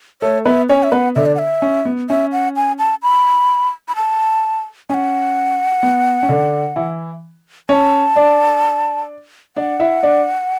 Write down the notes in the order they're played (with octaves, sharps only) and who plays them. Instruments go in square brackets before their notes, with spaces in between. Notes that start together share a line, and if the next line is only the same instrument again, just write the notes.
[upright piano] A3 A4 [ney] C#5
[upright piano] B3 B4 [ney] E5
[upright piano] C#4 C#5 [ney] G#5
[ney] E5
[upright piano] B3 B4 [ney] F#5
[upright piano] D3 D4 [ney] E5
[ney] D5
F#5
E5
[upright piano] C#4
B3
[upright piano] C#4 [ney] E5
[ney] F#5
G#5
A5
B5
B5
A5
[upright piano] C#4 [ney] G#5
[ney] F#5
[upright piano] B3
C#4
D3 D4
E3 E4
[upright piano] C#4 C#5 [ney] A5
[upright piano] D4 D5
[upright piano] D4 D5 [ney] F#5
[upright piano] E4 E5
D4 D5